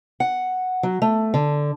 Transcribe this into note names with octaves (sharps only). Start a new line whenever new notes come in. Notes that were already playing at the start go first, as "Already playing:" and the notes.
F#5
F#3
A3
D3